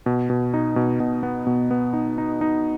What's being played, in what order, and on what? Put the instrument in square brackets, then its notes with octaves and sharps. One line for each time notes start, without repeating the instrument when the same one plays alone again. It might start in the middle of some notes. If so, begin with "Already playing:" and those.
[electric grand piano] B2
B2
D#4
B2
B2
B3
B2
B3
D#4
D#4
D#4